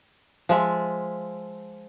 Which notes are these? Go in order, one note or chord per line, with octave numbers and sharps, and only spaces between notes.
F3 G#3 E5